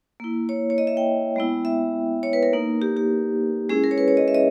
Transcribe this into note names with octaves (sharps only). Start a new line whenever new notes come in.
A#3 E4
C#5
C#5
D#5
E5
G5
G#3 B3 E4
E5
C#5
B4
A#4
A#3 D#4
G4
G4
G#3 C#4 E4 G#4
A#4
C#5
B4
C#5
D#5
E5
D#5